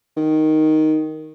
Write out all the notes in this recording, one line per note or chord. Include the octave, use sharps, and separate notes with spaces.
D#3